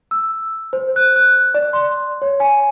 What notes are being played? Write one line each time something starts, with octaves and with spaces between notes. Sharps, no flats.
E6
C5
F#6
F#6
D5
C6
C#5
G#5